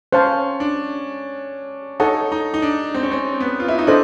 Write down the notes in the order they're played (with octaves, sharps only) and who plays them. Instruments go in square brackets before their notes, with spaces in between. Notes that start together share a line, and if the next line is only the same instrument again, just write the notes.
[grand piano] C#4 [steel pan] C5 F5 A5
[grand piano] D4
[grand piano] D#4 [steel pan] A4 C#5 F#5 A5
[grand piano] D#4
D#4
D4
C4
C#4
C4
B3
F4
E4
D#4
[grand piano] D4 [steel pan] A4 C5 D#5